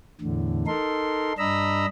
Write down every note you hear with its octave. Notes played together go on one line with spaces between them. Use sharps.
E2 A2 D3
D#4 A4 A#4 C6
G2 D4 D#5 A#5 B5 E6